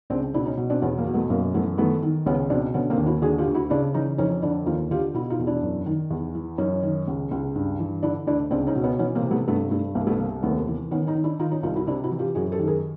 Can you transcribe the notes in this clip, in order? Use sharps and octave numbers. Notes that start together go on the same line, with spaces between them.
C#2 C4 D4
B2 D4 E4
C#4 D#4
B2
C4 D4
E2 B3 C#4
A#3
B2
A3 B3
F#2 A#3
E3 A3 B3
D#3 A3 B3
D#3
C#2 B3 C#4
B2 C4 D4
D3 B3 C#4
A#3 C4
D#2
E4 F#4
D3 F#4 G#4
F4 G4
D2
E4 F#4
C#3 D4 E4
E3 C#4 D#4
F2 C#4 D#4
D3 D4 E4
D#2 D#4 F4
D3 F4 G4
B2 E4 F#4
D#4 F4
E2
D4 E4
F#2
D#3
E2
E3
F#2 C#4 D#4
D#3
C#2
C#2
G2
E3
D3 D4 E4
D2 D4 E4
C#2 C4 D4
C#4 D#4
B2
B3 C#4
E3 B3 C#4
A#3 C4
C3
A3 B3
G2 A3 B3
G2 A3
C2 A#3
A3 B3
C3 A#3
D#2 A3 B3
E3
D#3 B3 C#4
C#4 D#4
D#3
D4 E4
D#3 D#4 F4
C#4 D#4
C2 D#4 F4
E4 F#4
C3 D4 E4
E4 F#4
E3
F4 G4
F#2 F#4 G#4
G4 A4
D#3
G#4 A#4